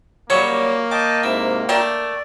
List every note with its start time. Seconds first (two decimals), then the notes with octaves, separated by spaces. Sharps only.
0.30 C#3 F#3 G3 A#3 C#5
0.91 D#5 G5 A5 D6
1.24 G#2 C3 E4
1.69 A3 D4 A#4 D5 G5